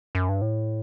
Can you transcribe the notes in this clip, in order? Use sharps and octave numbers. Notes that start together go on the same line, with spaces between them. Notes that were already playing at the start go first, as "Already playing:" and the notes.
F#2
G2
A2